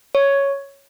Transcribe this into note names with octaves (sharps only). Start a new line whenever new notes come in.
C#5